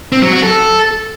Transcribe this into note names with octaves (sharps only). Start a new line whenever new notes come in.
C4
F#3
F#4
A4